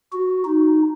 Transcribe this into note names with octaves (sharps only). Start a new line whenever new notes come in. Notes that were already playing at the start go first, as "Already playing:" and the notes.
F#4
D#4